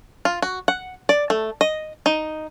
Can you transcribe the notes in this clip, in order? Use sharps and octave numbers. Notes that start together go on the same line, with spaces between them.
F4
F#4
F#5
D5
A3
D#5
D#4